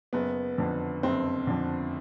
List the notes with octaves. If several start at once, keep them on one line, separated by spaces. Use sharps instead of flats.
F#1 B3
F2 D3
F#1 C4
F2 D3